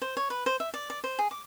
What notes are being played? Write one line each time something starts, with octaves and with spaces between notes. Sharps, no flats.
C5
C#5
B4
C5
E5
D5
D5
C5
G#4
D6